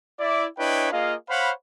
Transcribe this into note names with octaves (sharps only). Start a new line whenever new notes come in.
E4 D5
D4 E4 B4 C#5 D#5 G5
A#3 F4 G#4 D#5 F5
C5 C#5 F5 F#5 B5